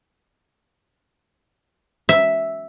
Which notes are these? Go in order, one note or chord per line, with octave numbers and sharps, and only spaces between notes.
E5